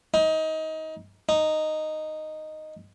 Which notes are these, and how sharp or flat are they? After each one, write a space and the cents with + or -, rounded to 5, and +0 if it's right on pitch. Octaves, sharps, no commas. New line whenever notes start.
D#4 +25
D#4 -5